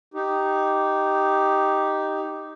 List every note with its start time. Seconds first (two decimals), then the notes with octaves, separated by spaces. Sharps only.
0.14 D#4 G4